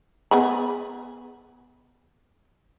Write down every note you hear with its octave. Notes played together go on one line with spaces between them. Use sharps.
B3 G#4 B5